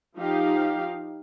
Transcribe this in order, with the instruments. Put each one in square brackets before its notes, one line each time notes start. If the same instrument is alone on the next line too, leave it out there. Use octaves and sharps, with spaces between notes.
[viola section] F3 D#4 G4 F5